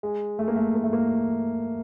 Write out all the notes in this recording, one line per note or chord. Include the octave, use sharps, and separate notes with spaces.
G#3
A3
A#3
A3
A#3
A3
A#3